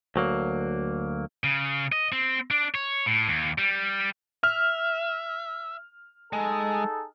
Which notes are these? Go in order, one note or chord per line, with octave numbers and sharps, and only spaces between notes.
D2 F#3 A#3
C#3
D#5
C4
D4
C#5
A2
D#2
G3
E5 F6
G#3 D#4 G#4 A4